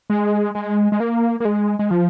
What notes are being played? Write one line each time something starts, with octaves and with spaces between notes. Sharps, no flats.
G#3
G#3
G#3
A#3
A#3
G#3
G#3
F3